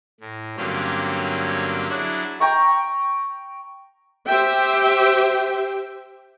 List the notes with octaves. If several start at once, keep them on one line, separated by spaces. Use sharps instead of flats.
A2
G2 D3 F#3 A#3 C4 C#4
F#3 D4 E4 F#4 G#4 F#5
G5 A#5 C#6
G4 C5 E5 G5